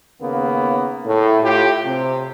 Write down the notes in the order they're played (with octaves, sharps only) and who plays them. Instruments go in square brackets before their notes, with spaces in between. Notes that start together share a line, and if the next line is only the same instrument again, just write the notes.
[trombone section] D#2 C#3 A#3 B3
A2
A2 F4 G4
C3